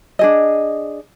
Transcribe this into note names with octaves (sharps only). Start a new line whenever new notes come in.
D4 G#4 D#5